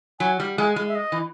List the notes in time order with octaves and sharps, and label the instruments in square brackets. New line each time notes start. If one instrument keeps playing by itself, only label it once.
[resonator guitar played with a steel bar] F#3 [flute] G#5
[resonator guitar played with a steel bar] G3
[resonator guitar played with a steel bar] G#3 [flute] G#5
[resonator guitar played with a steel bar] G#3
[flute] E5
D#5
[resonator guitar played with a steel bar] E3